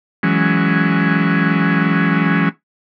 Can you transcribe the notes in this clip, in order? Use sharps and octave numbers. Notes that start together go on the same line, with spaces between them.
E3 F#3 G#3 C#4